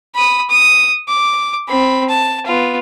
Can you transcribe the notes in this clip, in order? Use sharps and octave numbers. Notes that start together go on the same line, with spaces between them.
B5 D#6
D#6
D6
C4 B5
A5
B3 F4